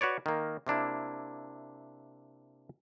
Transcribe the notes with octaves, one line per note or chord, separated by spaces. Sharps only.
F#4 B4 C#5 D5
D#3 A#3
C3 A#3 D4 E4